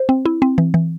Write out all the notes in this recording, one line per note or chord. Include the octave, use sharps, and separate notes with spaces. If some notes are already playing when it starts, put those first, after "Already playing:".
Already playing: C5
C4
E4
C4
E3
E3